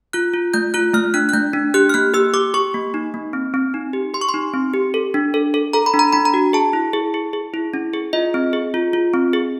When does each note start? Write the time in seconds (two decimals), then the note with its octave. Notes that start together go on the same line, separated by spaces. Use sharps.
0.13 F4 F#6
0.33 F4
0.54 A3 G6
0.74 F4 F#6
0.94 A3 F6
1.14 D4 F#6
1.29 F#6
1.33 A3 G6
1.53 D4
1.74 G4 F#6
1.89 F6
1.94 A#3 F#6
2.14 G4 E6
2.33 G4 D6
2.54 G4 C#6
2.74 A#3
2.94 D#4
3.14 A#3
3.33 C4
3.54 C4
3.74 D#4
3.93 G4
4.14 G4 C6
4.21 C#6
4.29 C6
4.34 D#4
4.54 C4
4.74 G4
4.94 A4
5.14 D4
5.34 A4
5.54 A4
5.73 A4 A#5
5.86 B5
5.94 D4
5.99 A#5
6.13 D4 B5
6.25 A#5
6.34 F#4
6.53 G#4 A5
6.73 E4
6.93 G#4
7.14 G#4
7.33 G#4
7.54 E4
7.73 C#4
7.93 G#4
8.13 F4 D#5
8.34 C4
8.53 G#4
8.74 F4
8.93 F4
9.14 C4
9.33 G#4